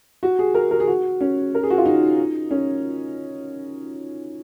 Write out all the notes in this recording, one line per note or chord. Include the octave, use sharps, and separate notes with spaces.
F#4
G#4
A#4
A#4
G#4
F#4
C#4
A#4
G#4
F#4
F4
D#4
C#4